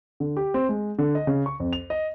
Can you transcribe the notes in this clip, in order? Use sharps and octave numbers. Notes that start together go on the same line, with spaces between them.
D3
G4
C4
G#3
D3
D#5
C#3
C#6
F2
F7
D#5